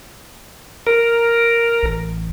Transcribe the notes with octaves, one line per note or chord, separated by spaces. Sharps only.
A#4
A1